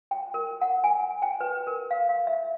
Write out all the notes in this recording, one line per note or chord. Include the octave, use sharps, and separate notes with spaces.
G5
A#4
F#5
G#5
G5
B4
A#4
F5
F5
E5